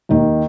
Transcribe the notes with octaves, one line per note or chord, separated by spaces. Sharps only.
D#2 D#3 A#3